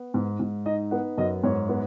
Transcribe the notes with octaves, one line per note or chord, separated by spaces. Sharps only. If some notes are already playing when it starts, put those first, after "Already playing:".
Already playing: B3
G#2
G#2
D#4 D#5
B3 F#5
F#2 D#5
G#2 C#5
B3